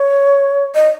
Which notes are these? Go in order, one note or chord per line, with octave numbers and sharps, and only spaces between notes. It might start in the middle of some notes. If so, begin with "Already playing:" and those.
Already playing: C#5
D#5